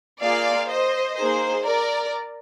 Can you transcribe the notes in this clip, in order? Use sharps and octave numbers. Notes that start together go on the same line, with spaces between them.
A#3 F4 G#4 D5 F5
C5 D#5
A#3 D#4 G#4 C5
A#4 D5